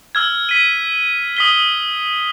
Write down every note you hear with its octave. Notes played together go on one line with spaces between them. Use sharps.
E6 F6 G#6
B6 D#7
D#6 B6 G7